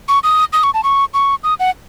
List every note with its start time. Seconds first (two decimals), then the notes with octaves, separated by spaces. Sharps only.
0.08 C#6
0.24 D#6
0.53 D#6
0.63 C#6
0.74 A5
0.84 C#6
1.14 C#6
1.44 D#6
1.60 F#5